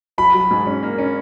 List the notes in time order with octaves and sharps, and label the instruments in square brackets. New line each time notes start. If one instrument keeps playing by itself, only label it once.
[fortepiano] F#3 [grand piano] B5
[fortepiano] F#3
G#2
C#4
A#3
C#4